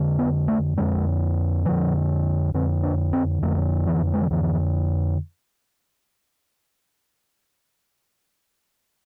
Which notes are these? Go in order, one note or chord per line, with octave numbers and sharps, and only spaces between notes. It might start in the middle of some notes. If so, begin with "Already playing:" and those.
Already playing: F2 D3
B3
A3
F2 D3 G#3
F2 D3 F3
F2 D3 C4
D4
C4
F2 D3 A3
E3
G#3
F3
F2 D3 E3